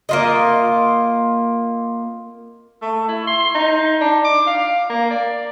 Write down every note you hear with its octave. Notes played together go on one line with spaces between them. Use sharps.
A#3 F4 D#5
A3
E4
C6
D#4
D4
D6
F5
A#3
D5